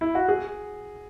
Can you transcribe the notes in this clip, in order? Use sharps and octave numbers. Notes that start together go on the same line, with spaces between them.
E4
F#4
G#4